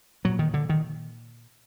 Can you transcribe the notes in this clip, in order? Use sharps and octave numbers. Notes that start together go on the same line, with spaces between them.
A#2 F#3
D#3
D3
D#3